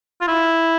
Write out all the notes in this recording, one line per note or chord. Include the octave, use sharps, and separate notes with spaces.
F4
E4